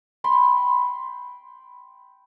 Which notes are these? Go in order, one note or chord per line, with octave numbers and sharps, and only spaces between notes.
G5 B5 C6